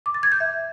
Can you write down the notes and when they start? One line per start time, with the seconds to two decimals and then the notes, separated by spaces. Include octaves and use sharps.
0.06 D6
0.14 A6
0.23 G#6
0.32 G6
0.40 E5